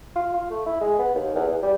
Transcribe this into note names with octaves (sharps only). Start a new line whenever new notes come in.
F4
F4
A3
E4
G#3
B3
D#2
E2
E2
G3